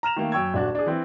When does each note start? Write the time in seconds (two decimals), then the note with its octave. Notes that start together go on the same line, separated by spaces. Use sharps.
0.03 A#5 F6 E7 F7
0.16 D#3 A3 A#3
0.32 F#2 G5 C#6 E6 G#6
0.54 D#1 D4 F#4
0.75 D4 G#4
0.86 E3 C4